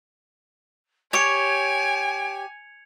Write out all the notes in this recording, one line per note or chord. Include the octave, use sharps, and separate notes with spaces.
G4 C#5 G#5 G#6 C#7 D7 F7